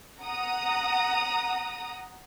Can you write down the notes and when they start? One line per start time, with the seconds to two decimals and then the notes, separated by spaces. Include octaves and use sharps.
0.22 F#5 A#5 D#6